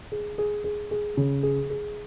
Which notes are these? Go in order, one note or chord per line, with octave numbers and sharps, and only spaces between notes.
G#4
G#4
G#4
G#4
C#3
G#4
G#4